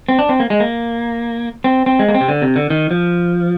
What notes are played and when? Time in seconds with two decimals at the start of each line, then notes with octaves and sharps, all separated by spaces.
0.09 C4
0.19 D4
0.29 C4
0.40 A#3
0.50 G#3
0.60 A#3
1.64 C4
1.86 C4
1.99 G#3
2.09 A#3
2.14 C4
2.21 C3
2.28 D3
2.42 C3
2.56 D3
2.70 D#3
2.91 F3